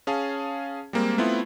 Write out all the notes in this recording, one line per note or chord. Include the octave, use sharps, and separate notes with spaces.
C#4 G#4 F5 A5
G3 G#3 A#3 C4
A3 B3 C4 E4 F4